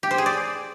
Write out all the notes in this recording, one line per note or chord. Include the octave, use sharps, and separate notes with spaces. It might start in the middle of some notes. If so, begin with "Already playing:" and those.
G4
C5
G#4
D5